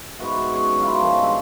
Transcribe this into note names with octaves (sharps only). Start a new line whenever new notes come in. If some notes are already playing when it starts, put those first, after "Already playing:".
G#2 B3 F#4 E5
C#4 G#4 C#5 D6
F#3 E4 F4
D#3 F3
G2 G#3 E5